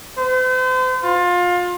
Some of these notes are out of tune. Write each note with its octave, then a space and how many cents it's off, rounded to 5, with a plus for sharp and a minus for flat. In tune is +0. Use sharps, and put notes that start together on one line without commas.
C5 -40
F4 +25